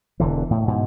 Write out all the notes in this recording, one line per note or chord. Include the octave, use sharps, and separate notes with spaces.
E1 D3 E3
A2
G#2 B2